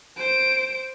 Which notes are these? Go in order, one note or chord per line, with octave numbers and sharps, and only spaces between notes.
C5 D7